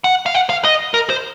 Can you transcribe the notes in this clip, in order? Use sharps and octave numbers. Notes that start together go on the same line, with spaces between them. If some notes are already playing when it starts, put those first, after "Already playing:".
F#5
F5
F#5
F5
D#5
A#4
C5